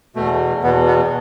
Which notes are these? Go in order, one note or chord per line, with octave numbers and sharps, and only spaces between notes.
E2 B2 A3
E2 B2 B3
B3